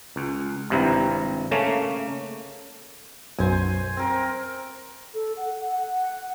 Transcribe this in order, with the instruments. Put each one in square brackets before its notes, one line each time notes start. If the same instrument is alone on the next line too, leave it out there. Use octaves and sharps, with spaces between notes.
[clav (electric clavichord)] C#2
G#1 G2 C3 E4 A#5
C#3 A3 A#3 C#4
[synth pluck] B1 F#2 [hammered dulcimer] C5 G#5
[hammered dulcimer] C4 A#4
[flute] A4
F#5
F#5